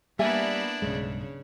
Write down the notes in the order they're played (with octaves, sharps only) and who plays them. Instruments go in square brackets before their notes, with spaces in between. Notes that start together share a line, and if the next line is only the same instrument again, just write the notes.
[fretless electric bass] G3 [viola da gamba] A#3 B3 [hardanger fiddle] D4 E4 [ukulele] D5 E5 G#5
[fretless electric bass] B1 G2 G#3 [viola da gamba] C#3